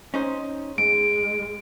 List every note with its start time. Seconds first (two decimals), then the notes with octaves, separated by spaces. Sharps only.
0.14 C#4 D#4 C5
0.78 G#2 G#3 D7